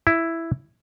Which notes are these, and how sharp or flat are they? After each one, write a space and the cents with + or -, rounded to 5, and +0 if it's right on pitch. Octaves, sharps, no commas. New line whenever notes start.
E4 +5